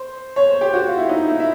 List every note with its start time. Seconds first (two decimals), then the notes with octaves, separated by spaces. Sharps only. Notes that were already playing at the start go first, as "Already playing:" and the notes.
Already playing: C5
0.36 C#5
0.49 C5
0.61 G4
0.73 F#4
0.88 F4
0.97 E4
1.09 D#4
1.28 E4
1.39 E4